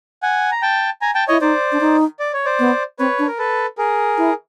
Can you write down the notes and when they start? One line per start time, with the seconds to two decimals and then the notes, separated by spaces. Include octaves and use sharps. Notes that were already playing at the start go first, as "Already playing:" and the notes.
0.23 F#5 G#5
0.52 A#5
0.62 G5 A5
1.02 G#5 A#5
1.15 G5 A5
1.28 E4 C#5 D#5
1.41 D#4 C5 D5
1.72 D4
1.80 D#4
2.19 D5
2.33 C#5
2.45 C5 D5
2.59 B3
2.99 C4 B4 C#5
3.19 D4
3.28 A#4
3.39 A4 B4
3.78 G#4 A#4
4.17 E4